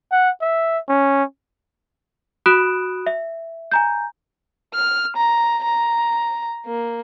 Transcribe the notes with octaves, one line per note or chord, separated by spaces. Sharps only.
F#5
E5
C#4
F#4 B5 D#6 F#6 D7 E7
E5
G#5 A#5 G6
F6
A#5
A#5
A#3